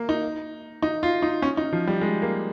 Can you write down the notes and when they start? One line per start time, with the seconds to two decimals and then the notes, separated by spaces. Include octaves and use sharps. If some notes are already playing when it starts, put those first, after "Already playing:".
Already playing: A#3
0.09 D#4
0.82 D#4
1.03 F4
1.22 D#4
1.42 C#4
1.57 D#4
1.73 F3
1.87 G3
2.01 G#3
2.22 A#3